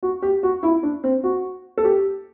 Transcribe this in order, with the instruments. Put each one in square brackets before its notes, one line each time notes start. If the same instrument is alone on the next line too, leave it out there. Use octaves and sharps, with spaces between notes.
[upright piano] F#4
G4
F#4
E4
D4
C4
F#4
A4
G4